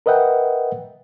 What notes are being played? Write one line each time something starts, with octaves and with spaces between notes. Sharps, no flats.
A#4 B4 D#5 E5 F#5 G5